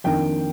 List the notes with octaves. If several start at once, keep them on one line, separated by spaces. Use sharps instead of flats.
F2 D#3 A#3 D4 G5